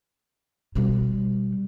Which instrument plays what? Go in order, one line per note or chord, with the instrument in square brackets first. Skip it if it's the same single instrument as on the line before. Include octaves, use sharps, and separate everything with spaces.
[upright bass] B2 G3